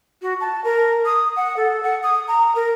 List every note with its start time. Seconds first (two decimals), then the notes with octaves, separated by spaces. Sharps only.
0.22 F#4
0.40 A5
0.64 A#4
1.05 D#6
1.36 F#5
1.56 A4
1.83 F#5
2.03 D#6
2.27 A#5
2.55 A#4